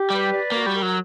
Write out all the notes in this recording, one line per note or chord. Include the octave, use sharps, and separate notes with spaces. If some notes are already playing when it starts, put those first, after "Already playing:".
Already playing: G4
G3 B4
D5
A#3 F#4
G3
A#4
F#3